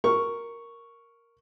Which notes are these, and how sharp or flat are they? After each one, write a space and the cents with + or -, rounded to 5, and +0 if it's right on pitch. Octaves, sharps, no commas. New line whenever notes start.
A#4 +0 C#6 +0